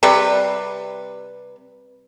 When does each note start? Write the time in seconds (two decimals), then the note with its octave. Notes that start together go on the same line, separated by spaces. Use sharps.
0.03 C3 G3 B4